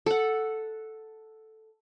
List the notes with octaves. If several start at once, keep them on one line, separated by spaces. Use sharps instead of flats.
A4 F#5